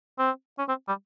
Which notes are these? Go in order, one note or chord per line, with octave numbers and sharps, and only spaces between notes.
C4
C#4
C4
G3